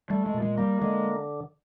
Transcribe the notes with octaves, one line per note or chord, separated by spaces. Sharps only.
G3 A3
G#3
A#2
G#3
G3 A#3
D3 G#3